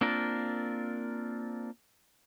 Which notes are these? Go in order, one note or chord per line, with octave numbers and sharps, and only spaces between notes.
A#3 C4 D4 F4 A#4